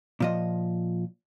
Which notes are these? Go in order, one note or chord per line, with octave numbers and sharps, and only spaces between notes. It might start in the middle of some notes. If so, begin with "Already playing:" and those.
A#2 F3 D#5